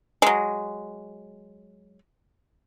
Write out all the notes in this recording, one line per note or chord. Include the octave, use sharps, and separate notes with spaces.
F#3 G#3